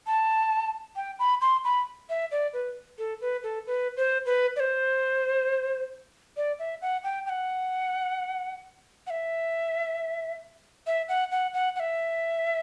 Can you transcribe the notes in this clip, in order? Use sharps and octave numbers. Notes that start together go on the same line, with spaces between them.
A5
G5
B5
C6
B5
E5
D5
B4
A4
B4
A4
B4
C5
B4
D5
C5
D5
E5
F#5
G5
G5
F#5
F#5
E5
E5
F#5
F#5
F#5
F#5
E5